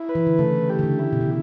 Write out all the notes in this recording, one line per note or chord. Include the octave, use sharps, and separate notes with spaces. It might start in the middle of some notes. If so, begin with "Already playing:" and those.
Already playing: E4
B4
E3
D3
C#3 A3
G4
D3
C#3
E4
B2
C#3